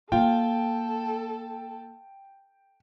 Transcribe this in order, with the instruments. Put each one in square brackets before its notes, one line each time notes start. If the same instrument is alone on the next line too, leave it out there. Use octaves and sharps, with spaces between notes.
[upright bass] A#3 [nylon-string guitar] F4 [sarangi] A4 [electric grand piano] G5